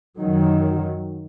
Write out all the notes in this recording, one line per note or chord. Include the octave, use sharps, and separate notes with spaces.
F#2 D#3 F#3